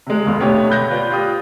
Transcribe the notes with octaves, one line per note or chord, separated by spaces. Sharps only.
C3 G#3
F1 E2 F5 C6
D2 B2 A3 B3 G4 C#5
B5 F#6 G6 A#6
F4 B4 D5
F4 G4 D#6